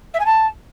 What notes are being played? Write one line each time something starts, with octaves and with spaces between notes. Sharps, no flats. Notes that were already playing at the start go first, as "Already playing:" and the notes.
E5
G#5
A5